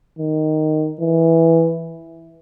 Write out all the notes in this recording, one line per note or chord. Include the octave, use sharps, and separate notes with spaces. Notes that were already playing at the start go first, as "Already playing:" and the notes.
D#3
E3